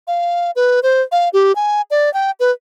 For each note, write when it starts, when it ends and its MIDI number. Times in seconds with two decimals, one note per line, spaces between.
0.07 0.51 77
0.56 0.80 71
0.83 1.02 72
1.12 1.29 77
1.33 1.55 67
1.55 1.82 80
1.91 2.12 74
2.14 2.31 79
2.40 2.51 71